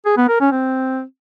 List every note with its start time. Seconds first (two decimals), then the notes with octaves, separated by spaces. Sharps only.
0.06 G#4
0.17 B3
0.29 A#4
0.40 C#4
0.52 C4